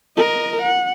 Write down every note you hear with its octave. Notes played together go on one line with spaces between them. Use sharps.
A#4 D#5
F#5